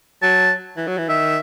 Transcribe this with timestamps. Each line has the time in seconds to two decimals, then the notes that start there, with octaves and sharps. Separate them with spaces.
0.22 F#3 A5
0.77 E3
0.88 F#3
0.98 E3
1.09 D#3 E5